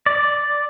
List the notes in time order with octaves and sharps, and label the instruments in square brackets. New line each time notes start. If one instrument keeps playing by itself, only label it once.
[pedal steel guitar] D5